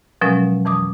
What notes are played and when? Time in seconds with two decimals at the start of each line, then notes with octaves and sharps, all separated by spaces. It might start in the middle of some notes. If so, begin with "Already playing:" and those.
0.21 B2 F3 F#3 G#3 C#4 A#4
0.65 F2 E3 D6 D#6